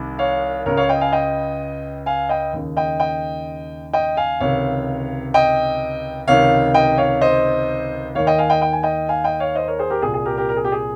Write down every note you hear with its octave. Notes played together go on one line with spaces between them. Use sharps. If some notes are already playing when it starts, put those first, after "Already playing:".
Already playing: C2 C3 D#3
C#5 F5
C#2 C#3 A#4 C#5
C#5 F5
D#5 G5
F5 G#5
D#5 G5
F5 G#5
D#5 G5
D#2 C#3
D#5 G5
D#5 G5
D#5 G5
F5 G#5
C#2 C3 D#3 C#5 F5
D#5 G5
C#2 C3 D#3 C#5 F5
D#5 G5
C#5 F5
C5 D#5
D#2 D#3 C#5 F5
D#5 G5
F5 G#5
D#5 G5
G5
G#5
D#5 G5
F5 G#5
D#5 G5
C#5 F5
C5 D#5
A#4 C#5
G#4 C5
G4 A#4
C2 A#2 G#4
G#4
G4 A#4
G4 A#4
A#4
G#4
G4
G#4